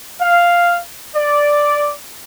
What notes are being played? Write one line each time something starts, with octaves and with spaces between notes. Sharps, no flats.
F5
D5